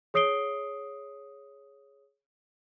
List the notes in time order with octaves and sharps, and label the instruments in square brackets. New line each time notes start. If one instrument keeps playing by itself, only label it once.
[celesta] G#4 C#5 D#6 C7 D7 G7